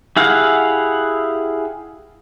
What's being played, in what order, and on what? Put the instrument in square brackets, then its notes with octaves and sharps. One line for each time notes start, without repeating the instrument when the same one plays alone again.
[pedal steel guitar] E4 G4 G#4 F5 F#5